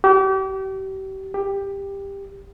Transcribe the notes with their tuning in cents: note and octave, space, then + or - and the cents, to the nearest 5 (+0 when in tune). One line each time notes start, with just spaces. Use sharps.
G4 -35
G4 +15